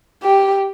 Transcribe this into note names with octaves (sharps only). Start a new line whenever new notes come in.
G4